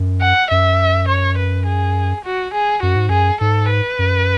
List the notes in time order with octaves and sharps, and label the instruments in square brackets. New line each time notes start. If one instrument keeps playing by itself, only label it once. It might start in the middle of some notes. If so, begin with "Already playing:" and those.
Already playing: [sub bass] F#2
[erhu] F#5
[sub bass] F#2 [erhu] E5
[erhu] C#5
B4
G#4
F#4
G#4
[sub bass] F#2 [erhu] F#4
[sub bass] G#2
[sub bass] F#2 [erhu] G#4
[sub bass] G#2 [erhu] A4
[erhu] B4
[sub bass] F#2